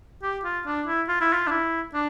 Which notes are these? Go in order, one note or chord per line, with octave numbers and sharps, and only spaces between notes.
G4
F4
D4
E4
F4
E4
F4
D4
E4
D4